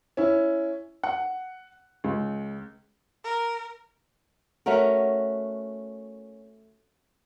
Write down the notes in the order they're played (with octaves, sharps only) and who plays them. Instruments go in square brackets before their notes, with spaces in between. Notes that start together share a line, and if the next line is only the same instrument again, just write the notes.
[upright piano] C#4 E4
F#5
C#2
[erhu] A#4
[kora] A3 C#4 F#4 A#4